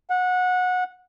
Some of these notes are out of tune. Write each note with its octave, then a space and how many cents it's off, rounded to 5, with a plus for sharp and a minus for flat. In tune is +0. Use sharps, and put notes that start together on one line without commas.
F#5 -20